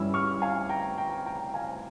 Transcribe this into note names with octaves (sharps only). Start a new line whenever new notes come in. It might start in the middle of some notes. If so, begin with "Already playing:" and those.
Already playing: G2 G3 C#4 E4 E6
C#6 F6
F5 G#5
G5 A#5
G5 A#5
G5 A#5
F5 G#5